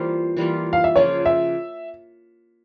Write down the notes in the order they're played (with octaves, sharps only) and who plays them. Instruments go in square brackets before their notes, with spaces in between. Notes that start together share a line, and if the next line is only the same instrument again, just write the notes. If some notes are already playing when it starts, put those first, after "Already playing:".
Already playing: [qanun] E3 G3 A#3 F4 [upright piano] C5
[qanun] E3 G3 A#3 F4
[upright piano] F5
E5
[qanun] C#3 F3 A#3 F4 [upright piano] C#5
[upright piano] E5